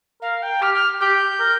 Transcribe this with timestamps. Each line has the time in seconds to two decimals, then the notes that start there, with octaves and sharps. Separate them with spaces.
0.22 A#4 F5
0.43 G5
0.61 G4 F6
0.74 F6
1.01 G4 G6
1.40 A#4